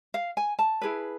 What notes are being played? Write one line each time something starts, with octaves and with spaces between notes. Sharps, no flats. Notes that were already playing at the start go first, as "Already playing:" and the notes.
F5
G#5
A5
E4 G#4 B4